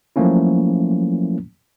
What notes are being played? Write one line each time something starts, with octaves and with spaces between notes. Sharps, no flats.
F3 F#3 A3 A#3 C#4 E4